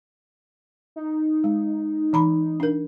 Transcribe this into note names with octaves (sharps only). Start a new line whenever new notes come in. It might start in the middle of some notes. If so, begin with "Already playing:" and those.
D#4
G#3
E3 A#5 B5
D4 A#4